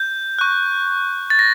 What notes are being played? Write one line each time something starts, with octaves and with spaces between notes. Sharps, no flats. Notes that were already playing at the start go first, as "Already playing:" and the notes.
Already playing: G6
C#6 F#6
A6
A#6